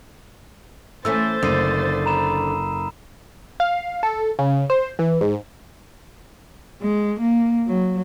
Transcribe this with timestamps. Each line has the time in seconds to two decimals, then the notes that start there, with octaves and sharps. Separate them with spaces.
1.05 E3 A3 C#4 C5 E6 A6 B6
1.43 F#1 D3 D#6 C7 D#7
2.06 A#5 B5 E7
3.60 F5
4.03 A4
4.39 C#3
4.70 C5
4.99 E3
5.21 G#2
6.82 G#3
7.20 A#3
7.68 F#3